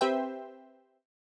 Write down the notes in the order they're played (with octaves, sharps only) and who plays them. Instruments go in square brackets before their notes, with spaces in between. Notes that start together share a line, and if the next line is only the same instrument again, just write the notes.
[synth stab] C4 G4 B4 C5 E5 G5